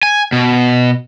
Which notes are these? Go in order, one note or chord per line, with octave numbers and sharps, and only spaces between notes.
G#5
B2